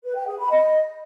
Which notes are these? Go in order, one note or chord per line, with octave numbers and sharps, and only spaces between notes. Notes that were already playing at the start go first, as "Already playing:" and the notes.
B4
G5
G#4
B5
D#5